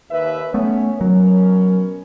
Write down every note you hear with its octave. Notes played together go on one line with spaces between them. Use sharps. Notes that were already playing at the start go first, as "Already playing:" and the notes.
D#2 B4 E5
A3 B3 C#4 C#5
B2 F#3 C#4 A#4